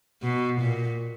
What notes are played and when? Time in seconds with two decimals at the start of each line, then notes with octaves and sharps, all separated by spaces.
0.23 B2
0.61 A#2